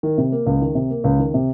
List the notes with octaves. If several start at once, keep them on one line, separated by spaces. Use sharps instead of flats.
D#3
C3
A#3
C#2
D#3
C3
A#3
C#2
D#3
C3